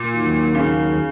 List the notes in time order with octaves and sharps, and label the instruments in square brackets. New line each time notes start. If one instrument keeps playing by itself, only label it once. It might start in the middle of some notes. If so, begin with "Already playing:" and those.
Already playing: [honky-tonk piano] A#2
[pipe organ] D#2 D#3 F#3
[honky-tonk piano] C#3